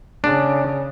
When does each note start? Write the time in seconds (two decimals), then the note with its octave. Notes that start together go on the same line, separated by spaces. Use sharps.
0.24 C#3 D4